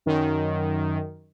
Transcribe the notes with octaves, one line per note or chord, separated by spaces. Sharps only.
F#2 D#3